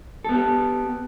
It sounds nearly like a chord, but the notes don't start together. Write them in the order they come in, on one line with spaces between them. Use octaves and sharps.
A4 B3 G4